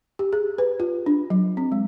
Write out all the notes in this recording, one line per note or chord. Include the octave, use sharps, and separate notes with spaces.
G4
G#4
B4
F4
D4
F#3
C4
G#3